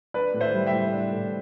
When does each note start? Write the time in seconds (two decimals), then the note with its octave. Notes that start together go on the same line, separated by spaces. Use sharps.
0.14 D4 B4 D5
0.34 A2
0.41 C5 E5
0.54 G3
0.67 E5 G5
0.73 A2
0.92 D4
1.13 A2